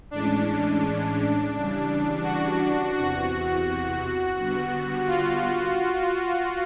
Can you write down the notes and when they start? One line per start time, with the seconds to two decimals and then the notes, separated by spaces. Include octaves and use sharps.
0.11 A2 E3 G#3 C#4 D4
1.53 C#3 E3 G3
2.23 F#4
2.94 E2 C3 E3 F#4
4.36 D3 G3 B3
5.07 F4